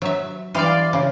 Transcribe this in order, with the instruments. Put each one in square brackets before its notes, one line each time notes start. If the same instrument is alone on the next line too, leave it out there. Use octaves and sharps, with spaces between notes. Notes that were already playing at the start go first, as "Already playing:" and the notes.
[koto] F#3 E5
[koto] E3 G3 [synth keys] D5 F5 C6
[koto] C#3